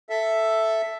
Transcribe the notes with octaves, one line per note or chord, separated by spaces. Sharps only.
A4 E5